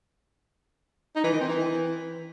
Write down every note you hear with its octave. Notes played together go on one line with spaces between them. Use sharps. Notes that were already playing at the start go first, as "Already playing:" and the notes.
D#4
E3
D#3
C4
E3